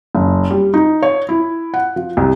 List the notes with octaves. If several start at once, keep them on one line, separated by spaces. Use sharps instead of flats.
F#1
G3
D#4
C#5
E4
F#5
F3
C2